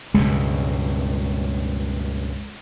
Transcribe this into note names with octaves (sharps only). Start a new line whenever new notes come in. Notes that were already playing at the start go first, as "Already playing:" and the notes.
C#2 G2 B2 G#3